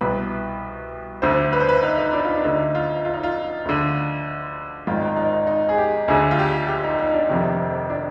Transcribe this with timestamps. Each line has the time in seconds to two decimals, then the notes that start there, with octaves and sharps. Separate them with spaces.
0.01 C2 B2 B4
1.22 D2 D3 C5
1.53 B4
1.60 C5
1.69 B4
1.83 D#4
1.98 D#4
2.13 D4
2.25 F4
2.29 D#4
2.37 D4
2.44 D2 D3 D#4
2.75 F4
3.05 F4
3.14 D#4
3.23 F4
3.65 D2 D3
4.87 G#1 G#2 D#3 F4
5.02 D#4
5.16 D#4
5.33 D#4
5.47 D#4
5.69 G#4
5.78 G4
6.08 D2 D3 G#4
6.31 F4
6.39 G4
6.68 G4
6.84 D#4
6.99 D#4
7.14 D4
7.29 F1 F2 C3 D#3
7.90 D4